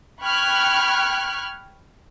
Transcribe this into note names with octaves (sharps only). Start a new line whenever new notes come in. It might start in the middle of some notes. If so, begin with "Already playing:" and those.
G5 B5 C#6 F6 F#6 G#6